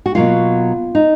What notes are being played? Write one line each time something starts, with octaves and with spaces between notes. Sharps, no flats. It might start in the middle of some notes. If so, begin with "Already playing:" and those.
F#4
B2 F#3 A#3 F4
D#4